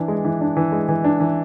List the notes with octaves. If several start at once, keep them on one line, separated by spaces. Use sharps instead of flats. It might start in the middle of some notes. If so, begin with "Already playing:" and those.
Already playing: E3 D4
G#3
E3
D4
E3
G#3
E3
D4
E3